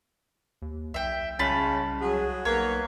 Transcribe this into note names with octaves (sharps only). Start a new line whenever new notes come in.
D#2
B1 E5 G5
C2 C#3 G#3 C#4 F4 A5 B5
F#3 G#4
B1 A#3 B3 A#4 C#5